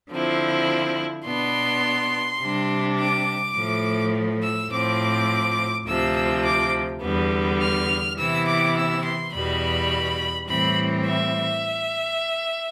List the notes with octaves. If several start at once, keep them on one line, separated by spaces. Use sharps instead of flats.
D3 F3 C4 E4
B2 B3 D4 C6
C3 G3 D4
D6
A2 F3 A3
E6
A2 F3 C4 D6
D2 C3 F3 E6
E6
D6
E2 D3 G3 B3
F6
C3 E3 B3 E4 E6
D6
E6
C6
E2 B2 G3 B5
A2 E3 G3 C4 B5
E5